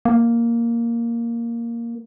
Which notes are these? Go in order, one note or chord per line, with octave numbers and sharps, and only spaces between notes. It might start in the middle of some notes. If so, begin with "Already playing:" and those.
A#3